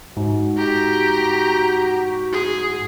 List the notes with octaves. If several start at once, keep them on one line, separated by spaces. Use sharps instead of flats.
G#2 F#4
G4 A#5
G#4